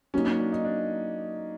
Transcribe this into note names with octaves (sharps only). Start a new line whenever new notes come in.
F#3 A#3 C#4 D#4
C#4
D4
D#4
D4